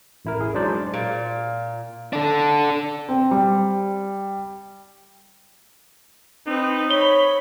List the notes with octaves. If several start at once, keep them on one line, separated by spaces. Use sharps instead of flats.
A1 E4 A#4
G#4
F#3 G#3 D4 D#4 C5 D5
A#2
D4 A4
C4
G3
C4 D#4 B4
C#5 B5 G7